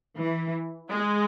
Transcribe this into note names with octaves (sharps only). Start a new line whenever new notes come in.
E3
G#3